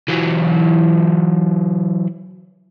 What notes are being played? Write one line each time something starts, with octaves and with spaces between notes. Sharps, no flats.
E3 F#3